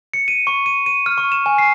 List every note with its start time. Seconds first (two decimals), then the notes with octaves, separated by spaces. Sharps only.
0.14 C#7
0.28 D#7
0.47 C#6
0.66 D#7
0.86 D#7
1.06 F6
1.18 C#6
1.32 E7
1.46 G#5
1.58 C7